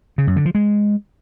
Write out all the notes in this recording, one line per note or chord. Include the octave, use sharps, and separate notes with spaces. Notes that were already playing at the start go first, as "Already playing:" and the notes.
C#3
F#2
D3
F3
G#3